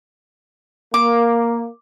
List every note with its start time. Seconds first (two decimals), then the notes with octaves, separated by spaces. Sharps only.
0.94 A#3 D6